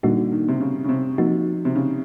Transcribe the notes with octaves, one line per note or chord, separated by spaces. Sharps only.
A#2 D3 G3 A#3 D#4 F#4
D#3
C3
C#3
C#3
C3
F3 A#3 D#4 F#4
C3
C#3